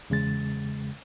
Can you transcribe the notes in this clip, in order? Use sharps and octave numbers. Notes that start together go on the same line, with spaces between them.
E2 C#3 G#3 A6